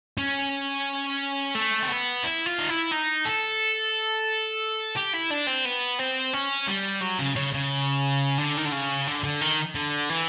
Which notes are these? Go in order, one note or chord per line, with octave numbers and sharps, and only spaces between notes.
C#4
A3
C4
B3
E4
F4
D#4
E4
D#4
A4
G4
E4
D4
C4
B3
C4
C#4
G3
F#3
C#3
C#3
C#3
D3
D#3
D3
C#3
D3
D3
D#3
D3
E3